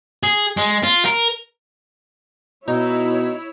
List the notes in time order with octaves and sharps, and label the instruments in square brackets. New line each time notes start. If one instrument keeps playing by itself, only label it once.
[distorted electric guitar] G#4
G#3
F4
A#4
[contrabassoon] B2 [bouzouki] D#4 [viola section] E4 C#5